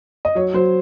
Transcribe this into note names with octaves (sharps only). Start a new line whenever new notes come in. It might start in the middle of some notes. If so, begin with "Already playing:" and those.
D#5
F#3 C#5
F#3 C5